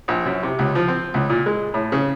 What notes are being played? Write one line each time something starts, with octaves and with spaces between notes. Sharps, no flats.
A#1
F#2
C3
C#2
F3
C4
C#2
A#2
G#3
A2
C#3